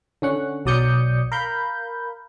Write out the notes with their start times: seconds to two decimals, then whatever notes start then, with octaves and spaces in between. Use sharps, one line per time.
0.22 D3 C#4 F#5
0.65 B1 F#3 D5 D#6 G6 C#7
1.32 A#4 F5 B5 G6